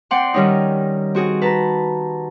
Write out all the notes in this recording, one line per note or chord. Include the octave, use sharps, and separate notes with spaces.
C4 D5 F#5 G5 C6
D#3 G3 C#4 D#4
C4 F#4 G#4
B4 A5 A#5